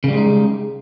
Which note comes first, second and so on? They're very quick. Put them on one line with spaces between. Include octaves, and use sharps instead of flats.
C#3 G3 G#3 D#4